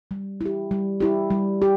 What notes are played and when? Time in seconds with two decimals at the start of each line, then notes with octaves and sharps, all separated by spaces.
0.11 G3
0.41 E4 G4
0.71 G3
1.00 E4 G4
1.30 G3
1.62 G4